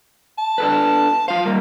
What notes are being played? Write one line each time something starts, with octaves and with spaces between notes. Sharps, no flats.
A5
D4 A4 B4
F4 C5 F5
G3 A#3 A#4